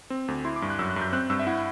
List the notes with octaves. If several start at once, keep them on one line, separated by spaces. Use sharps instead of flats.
C4
D2
E4 C6
D6
G2
F#6
F#2 E6
F#6
F#2
G6
C4 F#6
G2 E6
E5
E4 F#5